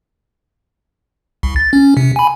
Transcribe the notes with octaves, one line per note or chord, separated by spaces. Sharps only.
C2
A6
C#4
C3
G#5 B5